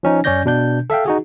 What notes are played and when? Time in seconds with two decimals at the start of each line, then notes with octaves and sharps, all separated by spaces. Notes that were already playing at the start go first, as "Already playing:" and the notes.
0.03 F3 C#4 D#4
0.24 F#2 C#4 C#5 D5 G6 A#6
0.46 B2 D4 G6
0.90 A4 E5 F5 G5
1.06 D#4 F#4 G#4